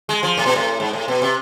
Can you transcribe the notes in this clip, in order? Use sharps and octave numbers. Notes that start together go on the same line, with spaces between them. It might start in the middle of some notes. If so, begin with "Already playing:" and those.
G#3
F3
A2
B2
A2
G#2
A2
B2
C3